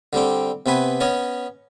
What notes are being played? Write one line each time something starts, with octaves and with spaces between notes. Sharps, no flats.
D3 G3 C4 G5
C3 B3 C4 B4 G#5
B3 C#4 C#5 D#5